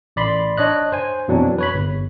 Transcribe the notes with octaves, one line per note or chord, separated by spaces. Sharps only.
A1 D5 B5 C6
D4 C#5 D#5 F#6
C5 G#5
F2 B2 E3 F#3 C4 D4
B4 C#5 B5
G1